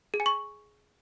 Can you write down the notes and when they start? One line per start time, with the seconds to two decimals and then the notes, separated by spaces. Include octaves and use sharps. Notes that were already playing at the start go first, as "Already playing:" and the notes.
0.14 G#4
0.20 G#5
0.26 C#6